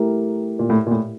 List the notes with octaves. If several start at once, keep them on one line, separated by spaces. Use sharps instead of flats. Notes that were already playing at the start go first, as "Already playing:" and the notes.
Already playing: A3 E4 G4 A#4
A#2
A2
A#2
A2